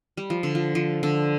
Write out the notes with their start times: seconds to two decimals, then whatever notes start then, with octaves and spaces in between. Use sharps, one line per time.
0.17 G3
0.30 F3
0.43 D3
0.55 F3
0.75 F3
1.03 D3